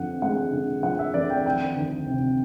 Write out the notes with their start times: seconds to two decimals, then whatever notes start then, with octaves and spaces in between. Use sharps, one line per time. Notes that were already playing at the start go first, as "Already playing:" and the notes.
Already playing: F2 D3 F3 F#5
0.22 G#3 F#5
0.52 D3
0.83 F3 F#5
0.99 E5
1.14 F2 D5
1.30 G5
1.45 D#3 G5
1.76 D2
2.07 C3